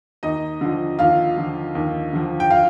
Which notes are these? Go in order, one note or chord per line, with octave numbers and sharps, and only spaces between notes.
D#2 D#4 D#5
D3 F3
D#2 F4 F5
D3 F3
D#2
D3 F3
G5
F4 F5